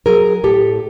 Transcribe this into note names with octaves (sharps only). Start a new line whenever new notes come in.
F#3 G#4 A#4
A2 G4 A4